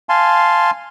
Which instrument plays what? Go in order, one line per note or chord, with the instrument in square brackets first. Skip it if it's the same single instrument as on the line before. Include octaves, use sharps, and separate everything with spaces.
[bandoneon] F5 G#5 A5 C6